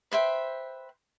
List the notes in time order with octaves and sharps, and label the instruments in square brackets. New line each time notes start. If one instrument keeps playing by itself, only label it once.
[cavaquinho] B4 C5 E5 G5